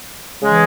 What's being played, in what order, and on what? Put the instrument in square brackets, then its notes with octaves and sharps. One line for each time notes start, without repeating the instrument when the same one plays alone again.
[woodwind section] C#3 E3 G#3